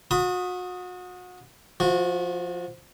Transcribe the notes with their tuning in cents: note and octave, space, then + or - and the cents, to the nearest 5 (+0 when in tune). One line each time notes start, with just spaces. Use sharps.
F#4 -35 B5 +15 D#6 +0
F3 +0 F#4 -30